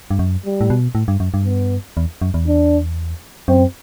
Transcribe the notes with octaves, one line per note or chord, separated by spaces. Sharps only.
G2
F#2
G3
A2
B2
A2
G2
F#2
G2
B3
E2
F#2
E2
D4
F#2 C4